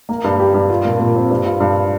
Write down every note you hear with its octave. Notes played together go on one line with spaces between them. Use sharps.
A#3
G2
G4
G2
F4
A#2
A#2
C4
G2
F4
G2